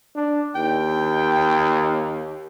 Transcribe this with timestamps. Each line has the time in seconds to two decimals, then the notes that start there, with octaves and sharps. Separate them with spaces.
0.15 D4
0.55 D#2 G5